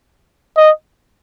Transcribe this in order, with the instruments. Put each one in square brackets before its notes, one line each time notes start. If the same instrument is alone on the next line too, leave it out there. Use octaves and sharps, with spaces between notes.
[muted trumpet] D#5